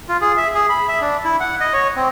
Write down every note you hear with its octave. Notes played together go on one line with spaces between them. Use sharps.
F4
G#4
E5
G#4
B5
E5
D4
E4
F#5
D#5
C#5
C4